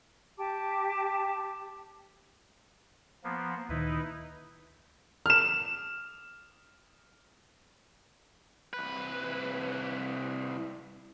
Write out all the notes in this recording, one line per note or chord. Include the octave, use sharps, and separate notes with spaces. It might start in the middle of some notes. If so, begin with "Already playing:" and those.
G4 A5 D6
F3 A#3 B3
D2 A#2 D#3 D#4 E4 B4
F6 E7
C2 B4